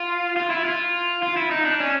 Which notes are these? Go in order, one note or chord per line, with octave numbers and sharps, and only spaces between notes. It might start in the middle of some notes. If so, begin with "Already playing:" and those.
Already playing: F4
F4
E4
F4
F4
E4
D#4
D4
C#4